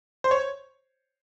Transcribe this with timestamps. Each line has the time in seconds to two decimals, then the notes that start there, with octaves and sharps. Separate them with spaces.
0.24 C5
0.31 C#5